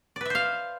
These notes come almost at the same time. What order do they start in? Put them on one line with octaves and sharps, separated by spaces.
D5 B4 E5 C5 F5